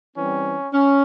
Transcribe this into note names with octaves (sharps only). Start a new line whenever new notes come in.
E3 G3 C4 C#4
C#4